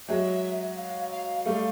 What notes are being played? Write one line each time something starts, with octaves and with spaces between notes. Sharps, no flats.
F#3 G#3 E5
F5
F5
G3 A3 F5